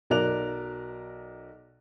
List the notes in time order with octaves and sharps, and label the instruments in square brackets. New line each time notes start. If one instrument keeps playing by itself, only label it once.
[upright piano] B1 F#3 A#4 D5 F#6 F7